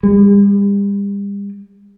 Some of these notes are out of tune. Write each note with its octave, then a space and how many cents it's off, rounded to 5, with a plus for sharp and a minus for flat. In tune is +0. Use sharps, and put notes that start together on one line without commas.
G3 +40